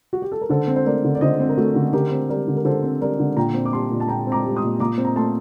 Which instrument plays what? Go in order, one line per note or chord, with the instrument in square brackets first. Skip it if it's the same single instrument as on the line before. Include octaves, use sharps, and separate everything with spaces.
[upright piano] F#4
G4
A4
A#4
D3 A4 C5
C4
C5
A3 A#4 D5
D3
D5
D3 C5 D#5
C4
A#4
A3 F#4 A4
D3
D3 G4 A#4
C4
G3 A#4 D5
D3
A#4
D3 A4 C5
C4
G3 A#4 D5
D3
A#2 G5 A#5
C4
D6
G3 A5 C6
A#2
A5
A#2 G5 A#5
C4 A#5 D6
G3
C6 D#6
A#2
A#2 A#5 D6
C4
A#5
A3 A5 C6